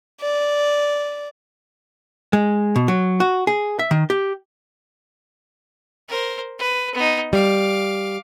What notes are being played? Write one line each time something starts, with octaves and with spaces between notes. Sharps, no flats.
D5
G#3
B2
F#3
F#4
G#4
E5
D#3
G4
A#4 C5
B4
B3 D#4
G3 F5 D6